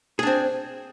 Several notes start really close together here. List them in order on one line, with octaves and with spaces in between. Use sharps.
G#4 D4 C4